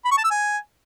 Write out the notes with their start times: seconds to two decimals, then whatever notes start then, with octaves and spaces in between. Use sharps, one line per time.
0.05 B5
0.11 C#6
0.18 A5
0.24 E6
0.30 G#5